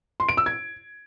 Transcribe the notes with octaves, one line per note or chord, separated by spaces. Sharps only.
C6
D7
E6
G#6